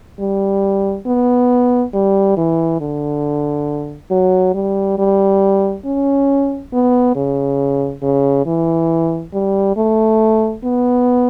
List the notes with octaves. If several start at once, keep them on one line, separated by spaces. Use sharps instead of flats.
G3
B3
G3
E3
D3
F#3
G3
G3
C#4
B3
C#3
C#3
E3
G3
A3
B3